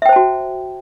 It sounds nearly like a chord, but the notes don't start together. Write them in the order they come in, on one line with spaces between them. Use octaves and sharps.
E5 G5 C5 A5 F#4